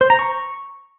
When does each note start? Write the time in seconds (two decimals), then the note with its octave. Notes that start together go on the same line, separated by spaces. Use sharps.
0.01 C5
0.10 A#5
0.19 C#6